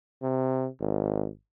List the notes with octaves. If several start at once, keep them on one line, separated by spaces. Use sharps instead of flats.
C3
G#1